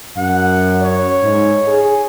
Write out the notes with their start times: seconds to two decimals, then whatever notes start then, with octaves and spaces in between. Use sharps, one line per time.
0.17 F#2 F#5
0.82 C#5
1.23 G#2
1.68 G#4